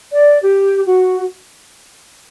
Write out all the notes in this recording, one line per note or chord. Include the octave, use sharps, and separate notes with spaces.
D5
G4
F#4